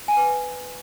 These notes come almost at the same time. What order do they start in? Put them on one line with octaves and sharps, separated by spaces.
G#5 F#5 B4